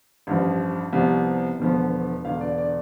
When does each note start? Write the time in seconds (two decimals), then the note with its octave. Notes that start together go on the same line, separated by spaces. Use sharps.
0.27 A1 G2 F3
0.93 C2 C3 F3 B3
1.59 E1 E2 D3 F3 B3
2.25 E1 E2 D3 F5
2.41 D5
2.58 D5